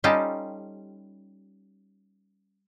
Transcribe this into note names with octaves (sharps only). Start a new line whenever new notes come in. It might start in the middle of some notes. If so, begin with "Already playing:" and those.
G3 C#4 D#4 F4 G4 A4